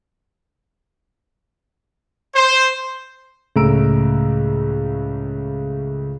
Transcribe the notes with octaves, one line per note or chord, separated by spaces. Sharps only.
C5
C#2 A2 A3 A#5 E6 D7